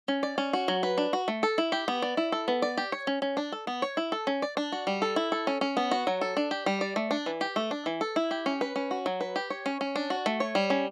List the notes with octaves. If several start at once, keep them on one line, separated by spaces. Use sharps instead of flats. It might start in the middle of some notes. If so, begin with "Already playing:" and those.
C#4
D5
C#4
F#4
F#3
B4
D4
F#4
A3
A4
E4
G4
B3
D5
E4
A4
B3
D5
G4
C#5
C#4
C#4
D4
A4
B3
C#5
E4
A4
C#4
D5
D4
F#4
G3
A4
E4
A4
C#4
C#4
B3
F#4
F#3
A4
D4
G4
G3
D5
A3
D4
E3
G4
A3
D4
E3
A4
E4
G4
C#4
B4
C#4
F#4
F#3
B4
G4
C#5
C#4
C#4
D4
F#4
A3
C#5
G3
C#4